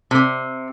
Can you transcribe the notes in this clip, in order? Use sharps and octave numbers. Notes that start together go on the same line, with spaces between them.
C3